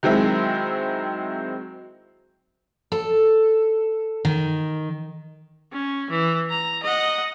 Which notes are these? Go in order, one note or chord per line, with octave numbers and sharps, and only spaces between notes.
D#3 F#3 G#3 C4 E4
A4
D#3
C#4
E3
A#5
D#5 F#5